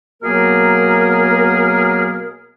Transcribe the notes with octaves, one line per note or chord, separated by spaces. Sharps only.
B2 F#3 A#3 B3 G#4 A#4